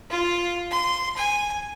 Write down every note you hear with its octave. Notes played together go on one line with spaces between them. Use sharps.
F4
C6
G#5